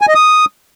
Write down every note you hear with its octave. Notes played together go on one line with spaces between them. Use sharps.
G#5
D#5
D#6